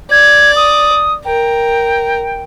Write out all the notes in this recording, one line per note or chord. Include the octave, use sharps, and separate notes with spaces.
D5 G#6
D#6
A#4 G5